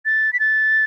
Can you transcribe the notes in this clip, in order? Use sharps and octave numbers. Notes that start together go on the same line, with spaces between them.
A6
B6
A6